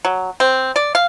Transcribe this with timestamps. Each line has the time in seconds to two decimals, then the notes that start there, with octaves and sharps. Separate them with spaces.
0.05 F#3
0.40 C4
0.76 D5
0.95 F5